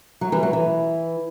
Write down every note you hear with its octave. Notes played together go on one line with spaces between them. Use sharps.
F#3
E3 G3
F#3
E3